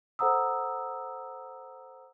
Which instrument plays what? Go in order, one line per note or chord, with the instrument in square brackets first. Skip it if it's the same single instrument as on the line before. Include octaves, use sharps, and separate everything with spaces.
[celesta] A4 C5 F#5 A#5 D#6 E6